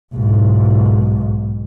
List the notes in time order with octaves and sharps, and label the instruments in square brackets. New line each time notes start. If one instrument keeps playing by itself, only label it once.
[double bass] B1 G#2